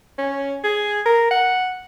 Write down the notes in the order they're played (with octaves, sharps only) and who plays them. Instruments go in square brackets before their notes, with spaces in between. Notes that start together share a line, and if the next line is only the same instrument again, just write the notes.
[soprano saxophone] C#4
G#4
A#4
F#5